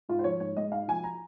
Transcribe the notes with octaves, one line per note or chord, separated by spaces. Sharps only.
G#2 F4
C5
F3 C#5
G#2 C#5
G#3 D#5
G#2 F5
F3 G#5
A#5